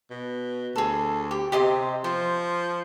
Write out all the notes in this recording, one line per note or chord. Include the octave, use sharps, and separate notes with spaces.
B2
D2 G#4 A4
G4
C3 G4 D#5 C6
F3 C5